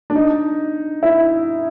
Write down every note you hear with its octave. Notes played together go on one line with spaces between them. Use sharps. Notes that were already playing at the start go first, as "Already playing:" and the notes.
D4
D#4
E4